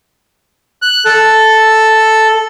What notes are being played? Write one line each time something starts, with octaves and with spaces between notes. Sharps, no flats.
F#6
A4